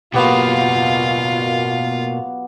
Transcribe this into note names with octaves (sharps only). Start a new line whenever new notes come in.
B2 F#3 A#3 B3 F4 G4 F5